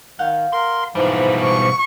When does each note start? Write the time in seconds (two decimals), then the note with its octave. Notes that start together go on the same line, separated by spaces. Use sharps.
0.19 D#3 F5 F#5 G6
0.53 A#4 C6
0.95 G#2 B2 E3 F3 G3
1.43 C#6 D6